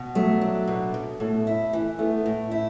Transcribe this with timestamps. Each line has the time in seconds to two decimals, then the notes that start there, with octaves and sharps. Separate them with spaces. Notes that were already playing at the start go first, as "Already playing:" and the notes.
Already playing: B2
0.15 F#3 A3
0.41 D4
0.67 B2
0.94 B2
1.20 A2 A3
1.47 E4
1.73 E3
1.99 A3 B3
2.26 A2
2.51 E4